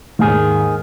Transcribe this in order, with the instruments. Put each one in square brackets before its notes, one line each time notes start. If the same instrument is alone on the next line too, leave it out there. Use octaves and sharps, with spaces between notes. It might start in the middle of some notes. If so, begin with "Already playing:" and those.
[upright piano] D#2 G#2 [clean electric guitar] D#3 G#4